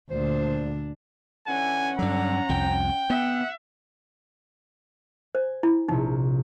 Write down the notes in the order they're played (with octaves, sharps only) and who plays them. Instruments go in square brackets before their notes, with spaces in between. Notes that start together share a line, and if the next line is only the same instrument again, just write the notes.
[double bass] D2 [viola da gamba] A#2 D4 [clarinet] C5
[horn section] D3 E3 [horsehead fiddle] C#4 F#5 [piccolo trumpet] G#5
[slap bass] G2 F#3 [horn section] D3 [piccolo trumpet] A#5
[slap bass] C2 F2 [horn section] G5
[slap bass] B3 [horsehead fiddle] E5 [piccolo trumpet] F#5
[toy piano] C5 [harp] G#5
[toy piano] E4
[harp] A#1 C3 F3 [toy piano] D#4